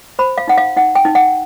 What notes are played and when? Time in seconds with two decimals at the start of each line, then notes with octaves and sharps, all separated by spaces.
0.19 C5 B5
0.38 F5
0.48 D#4 F#5
0.58 F5
0.77 D#4 F#5
0.95 G5
1.05 D#4
1.15 F#5